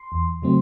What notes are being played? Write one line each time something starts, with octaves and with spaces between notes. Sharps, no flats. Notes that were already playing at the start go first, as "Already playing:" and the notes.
Already playing: C6
E2
C#3 F#3 A3 C4